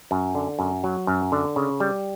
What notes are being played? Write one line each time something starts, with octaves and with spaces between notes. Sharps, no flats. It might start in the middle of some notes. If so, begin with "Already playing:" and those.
F#2
D3
F#2
F#3
F#2
D3
C#3
G3